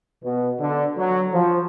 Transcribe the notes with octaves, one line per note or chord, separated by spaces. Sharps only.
B2
D3
F#3
F3